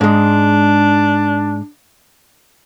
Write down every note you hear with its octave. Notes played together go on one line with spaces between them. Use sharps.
G#2 G#3 D4